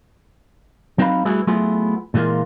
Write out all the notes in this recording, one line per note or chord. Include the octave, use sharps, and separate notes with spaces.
F#3 C4 D#4 B4 F5 B5
G3 A3 E4 F#4 G#4 B4
F#3 A3 B3 E4 F4 G#4
A#2 E3 G#3 A#3 F4